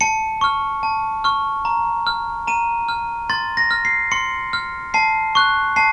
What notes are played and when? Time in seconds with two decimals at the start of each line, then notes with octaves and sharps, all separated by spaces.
0.01 A5 C#7
0.41 C#6 F6
0.83 A5
1.24 C#6 F6
1.65 A#5
2.07 F6
2.48 A#5 D#7
2.88 F6
3.30 C6 A6
3.57 A#6
3.71 F6
3.85 C7
4.12 C6 C#7
4.53 F6
4.94 A5 C7
5.35 C#6 F#6
5.76 A5 C7